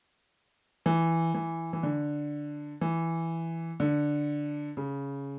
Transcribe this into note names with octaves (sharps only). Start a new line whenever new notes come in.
E3
E3
E3
D3
E3
D3
C#3